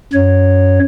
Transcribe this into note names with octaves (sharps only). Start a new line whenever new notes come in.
F#2 C#5